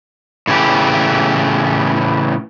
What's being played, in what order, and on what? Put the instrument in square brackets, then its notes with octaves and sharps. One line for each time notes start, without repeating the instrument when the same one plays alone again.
[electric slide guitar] A2 C#3 E3 G4